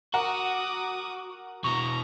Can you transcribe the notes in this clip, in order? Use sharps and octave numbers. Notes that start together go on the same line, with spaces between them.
F#4 A#4 F#5 A#5 D6 D#6
B2 E3 A#5 C#6